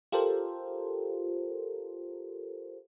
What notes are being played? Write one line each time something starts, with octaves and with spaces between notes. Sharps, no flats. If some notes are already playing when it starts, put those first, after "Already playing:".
F4 G4 A4 A#4 C5